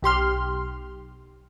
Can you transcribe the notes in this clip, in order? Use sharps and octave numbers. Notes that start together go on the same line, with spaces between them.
B1 G4 C6 F6